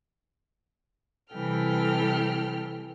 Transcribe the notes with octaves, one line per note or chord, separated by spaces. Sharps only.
C3 E3 G3 A4 G5 F6